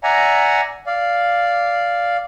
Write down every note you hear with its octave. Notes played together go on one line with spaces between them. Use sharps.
D5 E5 F#5 G#5 A#5
D5 F5